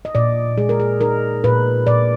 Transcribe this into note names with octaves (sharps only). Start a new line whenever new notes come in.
D#5
A#2 D5
G#3 G#4
A#4
G#4
D#4 A#4
A#2 B4
A#2 D5